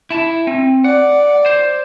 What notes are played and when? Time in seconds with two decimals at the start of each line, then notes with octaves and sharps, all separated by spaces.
0.10 E4 A5
0.47 C4
0.84 D5 F#5
1.46 C5